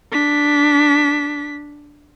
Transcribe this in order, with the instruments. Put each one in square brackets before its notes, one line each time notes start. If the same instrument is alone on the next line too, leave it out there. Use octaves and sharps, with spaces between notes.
[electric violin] D4 B6